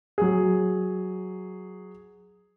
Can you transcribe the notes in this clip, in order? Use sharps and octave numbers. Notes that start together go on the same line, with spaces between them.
F#3 G#4